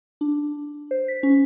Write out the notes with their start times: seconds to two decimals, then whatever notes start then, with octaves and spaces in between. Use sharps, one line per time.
0.21 D4
0.91 C5
1.08 B6
1.23 C#4